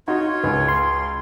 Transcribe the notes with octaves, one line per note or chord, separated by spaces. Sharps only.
D#4 F4 F#4 C#5
C#2
C6